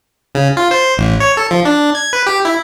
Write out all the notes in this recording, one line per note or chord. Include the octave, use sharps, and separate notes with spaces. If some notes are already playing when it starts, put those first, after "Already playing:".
C#3
F4
C5
A1
C#5
A4
F3
D4
G#6
B4
G4
E4